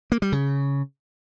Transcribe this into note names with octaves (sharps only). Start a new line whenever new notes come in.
A#3
G3
C#3